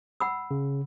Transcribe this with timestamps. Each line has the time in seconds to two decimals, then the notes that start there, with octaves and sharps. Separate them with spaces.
0.20 F#5 B5 E6
0.51 C#3